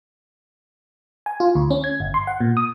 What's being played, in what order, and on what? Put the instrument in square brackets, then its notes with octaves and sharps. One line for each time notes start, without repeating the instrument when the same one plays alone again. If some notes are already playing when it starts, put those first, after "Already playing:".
[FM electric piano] G#5
F4
D2
C#4
G#6
G1
C6
F#5
A#2
D#6